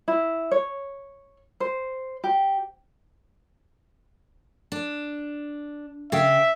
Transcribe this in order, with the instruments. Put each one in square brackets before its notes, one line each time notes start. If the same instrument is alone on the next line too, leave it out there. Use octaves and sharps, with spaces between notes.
[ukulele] E4
C#5
C5
G4
[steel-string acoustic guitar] D4
[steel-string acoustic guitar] C#3 F5 G5 [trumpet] E5